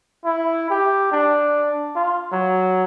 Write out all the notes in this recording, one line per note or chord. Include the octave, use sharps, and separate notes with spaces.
E4
G4
D4
F4
F#3